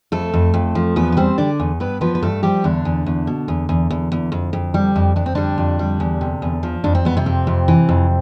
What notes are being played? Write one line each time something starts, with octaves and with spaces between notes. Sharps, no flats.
F2 A3 A4
F2
F2
F3
E2 B3 B4
B4
G3 C4 C5
D3 D4 D5
E2
G2 B3 B4
F3 B3 B4
B4
G2 A3 A4
F3 G3 G4
E2 D3 D4
E2
E2
B2
E2
E2
E2
E2
F2
F2
G3
F2
F2 D4
C4
D3 G3 D4
F2
G3
E2
C3
E2
F3
F2 D4
C4
F2 B3
C3 C4
F2
F2
E3
F2